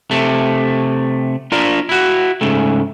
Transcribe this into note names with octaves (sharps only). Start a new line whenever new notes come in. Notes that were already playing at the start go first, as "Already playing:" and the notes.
C3 A3
D4 F4 A#4 D5 F5 A#5
E4 F#4
G#2 C#3 A3